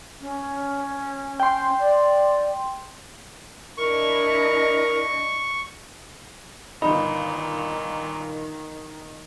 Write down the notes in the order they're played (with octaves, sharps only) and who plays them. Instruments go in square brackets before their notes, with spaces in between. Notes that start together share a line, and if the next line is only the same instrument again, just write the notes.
[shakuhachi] C#4
[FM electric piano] G5 C6
[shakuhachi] D5
[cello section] D4 E4 D#5 [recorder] A#4 [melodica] C#6
[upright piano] G1 D#4 [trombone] A#2 [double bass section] D#3 [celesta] B5